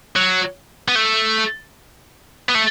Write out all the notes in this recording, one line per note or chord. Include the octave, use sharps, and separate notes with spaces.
F#3
B3
A3
B3
A3